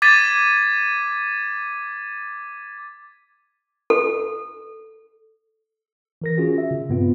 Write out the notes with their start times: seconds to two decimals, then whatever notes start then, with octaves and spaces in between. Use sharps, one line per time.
0.02 D6 G#6 A6 B6 D#7
3.90 A4
6.22 E3 A#4 A#6
6.38 C#4 F4 F#4 G#4
6.58 E5
6.71 C#3
6.89 G2 B2 B3 C4 F4